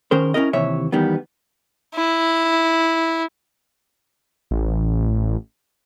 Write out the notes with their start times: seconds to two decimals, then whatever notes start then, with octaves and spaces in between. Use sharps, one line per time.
0.11 D#3 C#4 G#4 A#4 C5
0.34 C#4 D4 E4 A#4 D#5
0.53 D#2 C3 E3 C#5 E5
0.92 E2 D#3 G3 B3
1.95 E4
4.51 A1